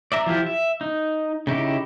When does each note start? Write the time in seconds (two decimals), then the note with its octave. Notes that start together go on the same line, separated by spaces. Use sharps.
0.12 D5 E5 A#5
0.26 F3 E4 F4 G4
0.46 E5
0.81 D#4
1.47 C#3 D#4 E4 G4